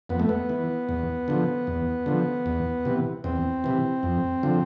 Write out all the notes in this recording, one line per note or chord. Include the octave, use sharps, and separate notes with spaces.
F2 B3
A3
B3
E3
E2
D3 F3
E2
D3 F3
E2
C3 E3
E2 C4
C3 E3
F2
D3 F3